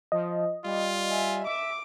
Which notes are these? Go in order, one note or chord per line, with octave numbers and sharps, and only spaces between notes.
F3 D#5
G3 F4
E5 G#5
E5 D6